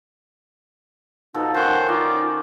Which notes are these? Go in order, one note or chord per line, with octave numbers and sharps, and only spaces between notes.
B2 F3 D#4 A4
D#3 C#4 C5 F#5
D#4 F4 D5